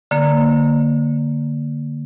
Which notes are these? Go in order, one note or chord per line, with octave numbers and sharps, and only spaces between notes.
D3 A#3